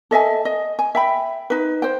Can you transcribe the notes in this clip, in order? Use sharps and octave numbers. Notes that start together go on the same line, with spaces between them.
A4 D#5 E5 G#5
D#5
G#5
E5 G5 B5
D#4 B4
C5 G5